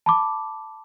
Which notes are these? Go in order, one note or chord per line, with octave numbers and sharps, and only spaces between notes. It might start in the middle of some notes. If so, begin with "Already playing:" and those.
A5 B5 D6